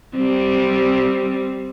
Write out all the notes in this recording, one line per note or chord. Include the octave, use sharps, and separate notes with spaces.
G3 C4